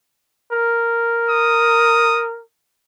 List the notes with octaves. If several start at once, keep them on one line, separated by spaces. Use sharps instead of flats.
A#4
D#6